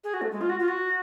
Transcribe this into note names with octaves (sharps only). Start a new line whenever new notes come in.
G#4
F#4
A3
G#3
F4
F#4
F4
F#4